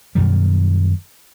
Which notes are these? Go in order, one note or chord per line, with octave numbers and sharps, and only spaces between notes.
F#2 B2 D#3 G3